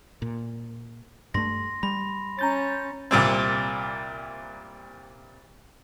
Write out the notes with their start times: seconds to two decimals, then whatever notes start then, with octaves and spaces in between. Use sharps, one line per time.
0.22 A#2
1.34 G2 A3 C6 A#6
1.83 G3 B5
2.39 C#4 A#5 G6 A6
3.11 C2 A#2 G3 C4